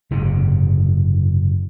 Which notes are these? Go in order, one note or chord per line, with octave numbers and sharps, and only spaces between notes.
F#1 G#2 C3